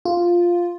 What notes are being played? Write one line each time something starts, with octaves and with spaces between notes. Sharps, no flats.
F4